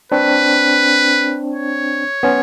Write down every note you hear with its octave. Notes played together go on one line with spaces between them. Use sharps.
C4 D4 B4
C#5
B3 C#4